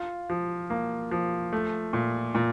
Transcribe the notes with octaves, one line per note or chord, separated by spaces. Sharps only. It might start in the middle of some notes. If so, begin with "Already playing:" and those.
Already playing: F4
F3
A#3
F3
A3
A#2
A#2